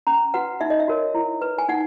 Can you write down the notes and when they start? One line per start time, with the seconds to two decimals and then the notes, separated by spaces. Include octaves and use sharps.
0.07 C#4 A#5
0.34 F#4 B4 F#5
0.61 D#4 E5
0.70 D#5
0.80 E5
0.88 F#4 A#4 C#5
1.14 E4
1.42 B4
1.58 G#5
1.69 D#4 F#5